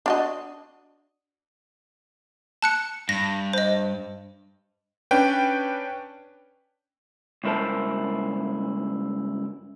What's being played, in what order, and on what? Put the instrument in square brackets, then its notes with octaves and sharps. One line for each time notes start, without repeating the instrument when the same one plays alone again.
[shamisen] D4 F#4 D#5
[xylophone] A5 F#6 C#7
[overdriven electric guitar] G2 [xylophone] A#6
[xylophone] C5 D#5
[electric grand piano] C#4 D4 B4 G5
[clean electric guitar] C#2 G2 E4 A#4 C5 A5